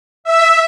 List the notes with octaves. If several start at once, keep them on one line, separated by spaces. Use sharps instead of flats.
E5